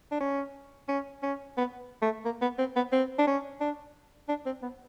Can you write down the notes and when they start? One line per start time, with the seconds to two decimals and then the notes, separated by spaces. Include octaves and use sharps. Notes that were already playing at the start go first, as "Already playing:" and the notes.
0.12 D4
0.21 C#4
0.89 C#4
1.23 C#4
1.57 B3
2.02 A3
2.25 A#3
2.42 B3
2.59 C4
2.76 B3
2.92 C4
3.19 D4
3.27 C#4
3.61 D4
4.29 D4
4.46 C4
4.63 B3